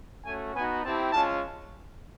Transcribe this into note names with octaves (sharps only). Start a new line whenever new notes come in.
A3 C#4 F#4 G#5
B3 D#4 F#4 G#5
C4 E4 G4 A5
G#3 C#4 F4 A5